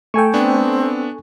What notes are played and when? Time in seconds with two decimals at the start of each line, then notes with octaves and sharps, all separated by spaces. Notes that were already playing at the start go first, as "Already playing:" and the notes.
0.14 A3 A4 G5 G#5 C#6
0.34 B3 C4 D4